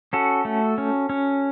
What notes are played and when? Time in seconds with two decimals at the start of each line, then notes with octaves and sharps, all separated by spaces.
0.13 C#4 F#4 A4
0.45 A3
0.78 C#4
1.09 C#4